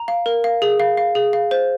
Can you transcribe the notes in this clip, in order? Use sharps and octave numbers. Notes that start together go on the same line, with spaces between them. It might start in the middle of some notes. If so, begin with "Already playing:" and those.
Already playing: A#5
F5
A#4
F5
G#4
F5
F5
G#4
F5
C5